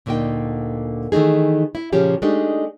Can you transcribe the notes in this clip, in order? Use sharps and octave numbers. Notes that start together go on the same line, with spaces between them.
D2 A#2 D3 A#3 D#4 G5
D#3 E3 A3 D#4 G#4
E4
A#2 C#3 F3 C#4 G4 G#4
G#3 A3 D4 D#4 G4